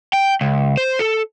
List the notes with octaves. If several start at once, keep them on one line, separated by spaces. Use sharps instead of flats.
G5
C#2
C5
A4